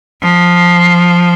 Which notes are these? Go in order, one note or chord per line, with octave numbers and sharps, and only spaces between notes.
F3